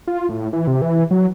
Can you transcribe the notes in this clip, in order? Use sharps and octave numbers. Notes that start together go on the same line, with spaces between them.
F4
A2
E3
C3
E3
F#3